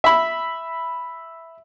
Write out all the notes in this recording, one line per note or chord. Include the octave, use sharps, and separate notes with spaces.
E5 B5